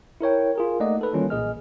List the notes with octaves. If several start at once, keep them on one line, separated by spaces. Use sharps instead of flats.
E4 A#4 C#5 G5
F4 G#4 A#4
A3 A#3 D#4 D5 D#5 F#5
A4 B4
D#3 E3 G3 A#3 C#4 F4
B1 A#2 G#4 D#5 F6